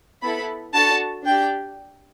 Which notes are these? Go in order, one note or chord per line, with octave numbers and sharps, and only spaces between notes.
B3 E4 A4 B5
D4 F#4 A4 A5
D4 G4 G5